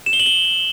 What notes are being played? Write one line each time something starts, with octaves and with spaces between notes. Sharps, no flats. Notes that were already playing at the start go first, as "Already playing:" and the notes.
E7
G7
F#7
G7